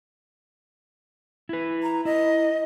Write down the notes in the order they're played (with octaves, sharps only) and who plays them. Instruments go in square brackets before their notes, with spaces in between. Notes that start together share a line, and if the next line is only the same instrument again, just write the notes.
[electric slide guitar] E4 B4
[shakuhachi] A#5
[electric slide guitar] E4 [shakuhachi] D#5